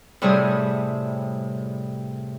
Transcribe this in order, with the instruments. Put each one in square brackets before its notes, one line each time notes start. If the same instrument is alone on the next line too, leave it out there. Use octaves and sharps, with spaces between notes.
[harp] A2 C3 G3 G#4 G#5 D#6